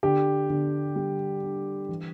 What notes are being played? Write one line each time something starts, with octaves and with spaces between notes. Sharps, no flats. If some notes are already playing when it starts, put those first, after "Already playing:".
D3 G4
D3
G3
D4
E3